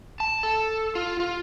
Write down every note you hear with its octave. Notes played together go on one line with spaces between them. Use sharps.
A5
A4
F4
F4